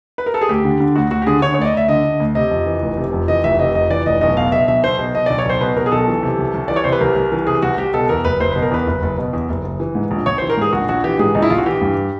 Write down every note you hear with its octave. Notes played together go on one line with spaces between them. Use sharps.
B4
A#4
A4
G#4
D2 G4
D3
D3
D2 F#4
D2 F#4
G4
D3 G#4
D3 C#5
C#5
D2 D5
D#5
D2 E5
D3 D#5
D3
D2
C3 D#5
F2
E3
F1
C3
F2
E3 D#5
F1 E5
C3 D#5
F2 D#5
E3 D5
F1 D#5
B1 D#5
B2 F5
B2 E5
B1 E5
B1 C5
B2
B2 D#5
B1 D5
C#5
B1 C5
B2 B4
B2 A#4
G#4
B1 A4
E3
C3
C2
C2
E3 D5
C#5
C3 C5
B4
C2 A#4
C2
E3
C3 G#4
C2 F#4
C2 G4
B2 A4
E2 A#4
F#1 B4
F#1 C5
B2 B4
A#4
E2 B4
F#1
F#1
B2
E2
F#1
F#1
E3
G#2
A#1
A#1 C#5
C5
E3
A#4
G#2 G#4
A#1 F#4
A#1 F#4
E3 G4
G#2 G#4
A#1 D#4
E4
A#1 F4
F#4
E3 G4
G2